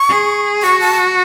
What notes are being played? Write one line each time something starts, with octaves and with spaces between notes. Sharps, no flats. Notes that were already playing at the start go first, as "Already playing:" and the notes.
Already playing: C#6
G#4
F#4 C#6
A5